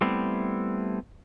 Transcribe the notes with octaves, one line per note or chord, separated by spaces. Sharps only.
G3 A3 B3 C4 E4